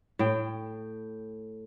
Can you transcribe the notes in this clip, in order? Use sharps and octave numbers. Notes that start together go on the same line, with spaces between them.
A2 G5